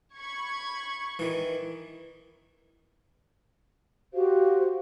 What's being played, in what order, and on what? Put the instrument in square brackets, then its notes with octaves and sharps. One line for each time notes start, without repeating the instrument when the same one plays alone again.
[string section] B5 C#6 G#6
[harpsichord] D#3 E3
[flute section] F#4 G4 C5 F5